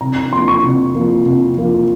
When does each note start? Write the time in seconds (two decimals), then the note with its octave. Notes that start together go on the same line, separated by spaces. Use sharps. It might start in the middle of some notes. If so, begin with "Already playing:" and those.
0.01 C3 A#5
0.16 A#5
0.32 F3 A#3 C6
0.48 C#6
0.64 C3
0.95 F3 A#3
1.26 C3
1.57 F3 A#3